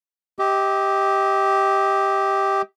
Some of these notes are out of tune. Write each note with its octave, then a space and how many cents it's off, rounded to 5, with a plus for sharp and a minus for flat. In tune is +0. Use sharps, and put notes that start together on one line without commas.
G4 +0 D#5 +35